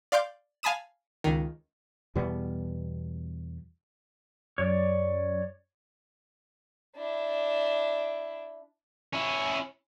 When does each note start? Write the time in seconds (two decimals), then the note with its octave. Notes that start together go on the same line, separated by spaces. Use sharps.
0.12 D5 F5 C6 D6 G6
0.63 F5 G#5 A5 B5 D#6 E7
1.24 C#2 D#3
2.15 E2 B2 G3 B3
4.58 F#2 C#5 D5
6.96 D4 E4
9.13 C#4 E4